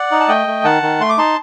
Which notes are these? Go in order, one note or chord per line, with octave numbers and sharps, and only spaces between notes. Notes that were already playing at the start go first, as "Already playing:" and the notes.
Already playing: D5 F#5
D#4
A5
A3 D#5 G5
A3
D#3 F#5 A5
D#3
A3 C6
D6
D#4 A5 C6